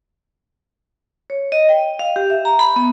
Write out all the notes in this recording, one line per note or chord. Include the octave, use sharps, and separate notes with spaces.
C#5
D#5
G5
F5
G4
E5
A#5
B5
B3